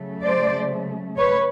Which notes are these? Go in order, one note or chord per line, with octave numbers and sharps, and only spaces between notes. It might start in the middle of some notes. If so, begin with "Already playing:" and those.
Already playing: C#3 F#3 A3
C5 D5
B4 C#5